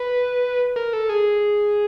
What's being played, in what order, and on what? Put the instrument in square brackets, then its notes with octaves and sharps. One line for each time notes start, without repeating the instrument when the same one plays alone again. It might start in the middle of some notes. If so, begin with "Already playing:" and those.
Already playing: [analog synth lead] B4
A#4
A4
G#4